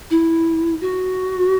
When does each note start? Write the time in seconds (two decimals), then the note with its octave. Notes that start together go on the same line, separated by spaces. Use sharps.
0.10 E4
0.81 F#4